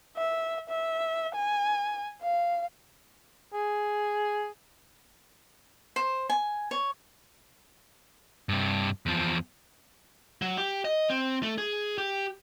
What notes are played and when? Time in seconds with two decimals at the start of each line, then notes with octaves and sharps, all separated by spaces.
0.17 E5
0.69 E5
1.35 G#5
2.22 F5
3.54 G#4
5.96 C5
6.29 G#5
6.71 C#5
8.49 G2 C3
9.06 E2 F3
10.42 F#3
10.58 G4
10.85 D#5
11.09 C4
11.43 A3
11.58 G#4
11.98 G4